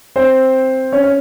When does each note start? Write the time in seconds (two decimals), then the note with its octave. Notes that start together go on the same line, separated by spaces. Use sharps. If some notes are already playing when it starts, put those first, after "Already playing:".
0.16 C4 C5
0.92 C#4 C#5
1.04 C#5